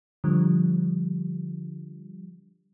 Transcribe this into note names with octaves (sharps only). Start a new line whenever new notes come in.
D3 F3 G3